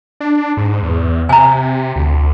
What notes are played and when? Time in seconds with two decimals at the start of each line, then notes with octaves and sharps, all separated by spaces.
0.20 D4
0.57 G#2
0.83 E2
1.29 C3 G#5 A#5
1.96 D2